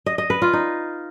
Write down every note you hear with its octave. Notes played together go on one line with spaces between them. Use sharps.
D#5
D#5
B4
F4
D#4